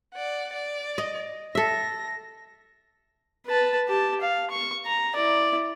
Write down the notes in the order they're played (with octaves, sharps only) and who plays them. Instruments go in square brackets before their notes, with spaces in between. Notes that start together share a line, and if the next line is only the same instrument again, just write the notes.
[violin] D5 F#5
D5
[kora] D#5
[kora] A4 E5 [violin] A#6
[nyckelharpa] B4 A5
G4 A5
F5
C#6
A#5
E4 D5